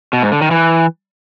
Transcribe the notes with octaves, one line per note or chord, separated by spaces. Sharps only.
B2
G#2
D3
D#3
E3